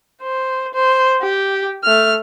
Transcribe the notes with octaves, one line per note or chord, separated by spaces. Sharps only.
C5
C5
G4
A3 F6